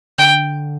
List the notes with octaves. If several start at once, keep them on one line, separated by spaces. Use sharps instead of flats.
D3 G5